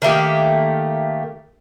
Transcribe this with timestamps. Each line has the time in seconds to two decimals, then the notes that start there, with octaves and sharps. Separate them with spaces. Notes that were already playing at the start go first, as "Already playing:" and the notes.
0.02 D#3 A3 A#3 G4